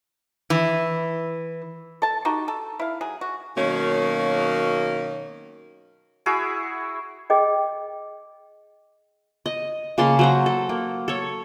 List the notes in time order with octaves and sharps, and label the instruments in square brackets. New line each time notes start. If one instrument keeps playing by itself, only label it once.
[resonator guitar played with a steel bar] E3
[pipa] A4 A5
D#4 F#4 G4
A4
E4 F5
F#3 G#4
F#4
[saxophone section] B2 D#3 F#3 A#3 C#4
[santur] E4 F#4 G#4
[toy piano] G#4 D#5 G5
[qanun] D#5
C#3 A#3 A5 C6
F#3 C5 A#5
A4
A#3
A4 C#5